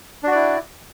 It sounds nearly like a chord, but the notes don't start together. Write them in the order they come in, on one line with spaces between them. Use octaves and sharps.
D4 F#4 D5 E4